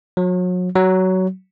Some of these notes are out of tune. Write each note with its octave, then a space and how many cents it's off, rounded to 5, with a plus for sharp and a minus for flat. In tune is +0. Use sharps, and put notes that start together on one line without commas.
F#3 -35
F#3 +15